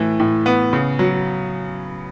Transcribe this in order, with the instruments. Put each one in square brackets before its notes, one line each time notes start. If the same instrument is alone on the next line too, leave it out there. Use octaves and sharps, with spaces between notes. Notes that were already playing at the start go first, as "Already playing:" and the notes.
Already playing: [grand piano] A2 E3 A3
A2
B3
C#3
F#3